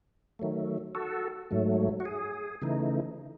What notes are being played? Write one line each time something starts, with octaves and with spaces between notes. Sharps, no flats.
D#3 F#3 A3
F#4 A4
G#2 F#3 A3
F#4
G#4
C#3 E3 A3 D#4